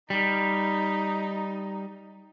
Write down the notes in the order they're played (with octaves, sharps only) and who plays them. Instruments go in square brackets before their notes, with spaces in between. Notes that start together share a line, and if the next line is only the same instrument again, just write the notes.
[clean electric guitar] G3 [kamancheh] D#4